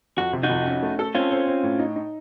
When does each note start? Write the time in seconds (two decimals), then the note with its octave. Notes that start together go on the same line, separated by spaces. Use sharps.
0.17 F2 F#4
0.33 C3
0.43 D#4 F#4
0.50 F2
0.66 C#4
0.82 A3
0.99 A4
1.15 C4 C#4 F4
1.31 C5
1.47 C4
1.63 A2
1.79 D#4
1.96 D#4